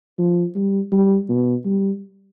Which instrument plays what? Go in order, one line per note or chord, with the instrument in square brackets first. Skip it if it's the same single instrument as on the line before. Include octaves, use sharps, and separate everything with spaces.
[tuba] F3
G3
G3
B2
G3